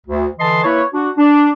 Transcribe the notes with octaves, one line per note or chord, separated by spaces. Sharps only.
D2
D3 E3 D#5 A5 C6
A#3 E4 B4 C#5
D4 F#4
D4